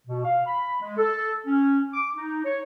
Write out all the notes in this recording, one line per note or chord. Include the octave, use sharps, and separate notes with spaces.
B2
F5
B5
G#3
A4
C#4
D6
D#4
C#5